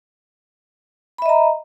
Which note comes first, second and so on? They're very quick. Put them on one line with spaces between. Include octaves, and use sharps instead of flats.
B5 E5 D#5 A#5